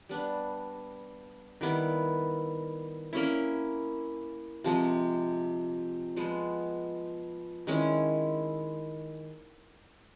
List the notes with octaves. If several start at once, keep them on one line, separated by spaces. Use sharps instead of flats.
G3 B3 D4
D#3 G3 B3 E4
A#3 C#4 E4
C3 F3 G#3
F3 G#3 B3
D#3 G#3 C#4 E4